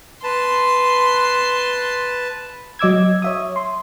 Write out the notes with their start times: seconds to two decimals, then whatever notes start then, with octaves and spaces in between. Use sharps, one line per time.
0.23 B4 A5 C6
2.79 F#3 D#5 D6 E6 G#6
3.22 C#5 E5 D#6
3.56 C6